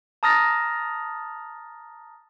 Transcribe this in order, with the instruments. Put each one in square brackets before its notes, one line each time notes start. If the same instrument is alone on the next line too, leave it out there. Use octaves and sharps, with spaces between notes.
[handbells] A5 A#5 D#6 F6 A6 A#6